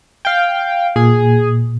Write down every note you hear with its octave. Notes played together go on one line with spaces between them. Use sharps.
F5 G5
A#2 G#4